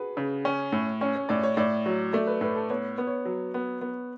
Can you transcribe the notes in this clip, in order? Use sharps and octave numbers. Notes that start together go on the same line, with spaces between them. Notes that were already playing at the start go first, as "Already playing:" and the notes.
Already playing: F#4 G#4 B4
C#3
C#4 C#5
A2
C#4 C#5
C#5
A2 D5
C#5
A2 D5
F#3 C#5
A3 D5
B4
A2 B4
A4
B3 C#5
B3
C#5
F#3
B3
B3